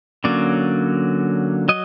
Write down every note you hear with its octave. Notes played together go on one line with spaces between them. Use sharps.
D3 F#3 A#3 C#4 D5
F#3 D#5